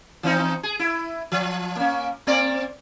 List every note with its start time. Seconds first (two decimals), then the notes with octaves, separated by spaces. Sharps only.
0.23 E3 C4 D#4
0.63 G#4
0.79 E4
1.32 F3
1.76 A#3 C#4
2.27 A#3 C4 D5